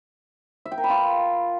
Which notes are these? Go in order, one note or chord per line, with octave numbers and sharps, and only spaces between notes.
E5
G5
A#4
B5
F4